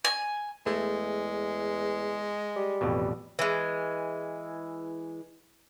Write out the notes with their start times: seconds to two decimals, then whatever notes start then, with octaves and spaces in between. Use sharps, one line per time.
0.05 G#5
0.66 E2 G#3 A3
2.56 G3
2.81 A1 F2 B2
3.39 E3 G#3